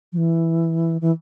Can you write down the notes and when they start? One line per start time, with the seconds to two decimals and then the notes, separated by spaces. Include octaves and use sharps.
0.13 F3
0.17 E3
1.01 E3